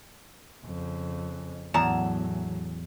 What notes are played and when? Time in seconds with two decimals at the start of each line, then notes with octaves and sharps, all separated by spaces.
0.65 F2 C#3
1.74 E2 A2 F#3 A5 A#5